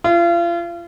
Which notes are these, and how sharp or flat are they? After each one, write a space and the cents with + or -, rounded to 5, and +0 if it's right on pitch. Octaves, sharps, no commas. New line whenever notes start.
F4 -35